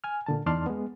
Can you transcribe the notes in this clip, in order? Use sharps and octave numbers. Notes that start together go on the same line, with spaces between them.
G#5 F6
A#2 D3 A5
E2 D#4 D5 A5 C6 F6
G#3 B3